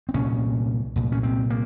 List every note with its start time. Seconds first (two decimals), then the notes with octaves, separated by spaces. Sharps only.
0.09 C4
0.14 C2 A#2 C#4
0.96 C2 A#2
1.12 C#4
1.23 C4
1.50 A#3